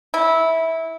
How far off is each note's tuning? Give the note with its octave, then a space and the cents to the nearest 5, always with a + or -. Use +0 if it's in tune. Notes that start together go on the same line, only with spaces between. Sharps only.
E4 -15